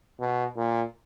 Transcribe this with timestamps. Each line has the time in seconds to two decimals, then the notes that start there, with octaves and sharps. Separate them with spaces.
0.20 B2
0.56 A#2